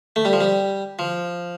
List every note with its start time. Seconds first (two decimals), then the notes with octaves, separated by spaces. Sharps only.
0.16 A3
0.25 G3
0.33 F3
0.41 G3
0.99 F3